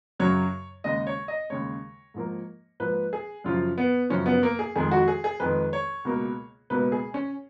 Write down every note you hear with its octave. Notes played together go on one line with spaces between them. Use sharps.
F#2 C#3 F#3 C#5
D#2 C#3 G#3 D#5
C#5
D#5
D#2 C#3 G#3 C#5
G#2 F3 A#3
G#2 F3 A#3 B4
G#4
F#2 C#3 F3 F4
B3
F#2 C#3 F3 C#4
B3
A#3
G#4
F2 D#3 G#3 G#4
F#4
G#4
G#4
F2 D#3 G#3 B4
C#5
C#2 B2 A#3
C#2 B2 A#3 B4
G#4
C#4